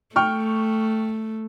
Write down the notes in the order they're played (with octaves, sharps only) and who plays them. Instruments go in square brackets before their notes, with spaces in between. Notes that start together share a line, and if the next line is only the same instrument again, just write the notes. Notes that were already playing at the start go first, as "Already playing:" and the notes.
[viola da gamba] A3 [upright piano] G5 C#6 F6